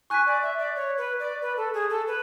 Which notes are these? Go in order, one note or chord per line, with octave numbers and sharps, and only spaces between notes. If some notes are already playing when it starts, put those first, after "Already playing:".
G#5 C#6 F#6 B6
D5
E5
D5
C#5
B4
D5
B4
A4
G#4
A4
B4